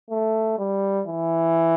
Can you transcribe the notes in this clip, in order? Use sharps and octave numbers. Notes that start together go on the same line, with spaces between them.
A3
G3
E3